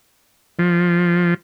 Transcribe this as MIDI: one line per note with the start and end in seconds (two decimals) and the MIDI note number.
0.59 1.34 53